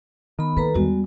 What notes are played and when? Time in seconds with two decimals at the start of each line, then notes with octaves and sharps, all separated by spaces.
0.39 D#3 B3 B5
0.57 A#3 A4 B4 A#5
0.74 E2 G3 G#3 B3 F#4